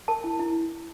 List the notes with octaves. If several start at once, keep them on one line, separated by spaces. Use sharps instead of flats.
A#4 A5
E4
E4